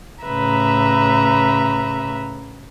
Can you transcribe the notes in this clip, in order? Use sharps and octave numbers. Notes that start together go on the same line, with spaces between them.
A2 C#3 B4 E5 A#5